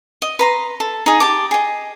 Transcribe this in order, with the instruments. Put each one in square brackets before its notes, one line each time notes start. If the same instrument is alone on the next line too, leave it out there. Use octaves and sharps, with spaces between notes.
[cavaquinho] D#5
B4 A#5 C6
A4
D#4 G#4
G4 A5 D6
G#4 D#5